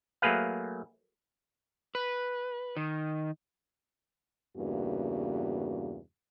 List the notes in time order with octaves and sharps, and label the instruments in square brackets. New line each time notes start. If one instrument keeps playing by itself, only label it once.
[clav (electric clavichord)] F#3 A3 A#3 G#4 B4 F5
[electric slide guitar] B4
D#3
[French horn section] E2 G2 C#3 A#3 F#4